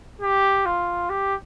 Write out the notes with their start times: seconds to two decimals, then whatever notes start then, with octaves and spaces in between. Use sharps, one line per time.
0.21 G4
0.66 F4
1.10 G4